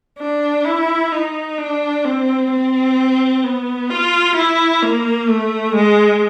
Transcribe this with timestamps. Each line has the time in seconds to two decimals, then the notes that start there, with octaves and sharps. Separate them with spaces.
0.19 D4
0.65 E4
1.12 D#4
1.58 D4
2.04 C4
2.51 C4
3.43 B3
3.90 F4
4.36 E4
4.82 A#3
5.28 A3
5.75 G#3